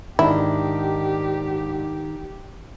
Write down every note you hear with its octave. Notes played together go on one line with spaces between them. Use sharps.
G#2 D#3 D4 E4 G4